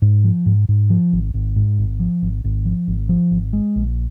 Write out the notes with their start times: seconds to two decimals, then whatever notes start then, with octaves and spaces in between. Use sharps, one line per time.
0.02 G#2
0.24 F3
0.46 G#2
0.69 G#2
0.90 F3
1.13 G#1
1.34 G#1
1.56 G#2
1.79 G#1
2.00 F3
2.22 G#1
2.44 G#1
2.65 F3
2.88 G#1
3.09 F3
3.31 G#1
3.53 G#3
3.76 A#1